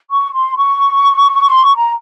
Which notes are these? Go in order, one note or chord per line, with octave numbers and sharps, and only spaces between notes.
C#6
C6
C#6
C6
C#6
A#5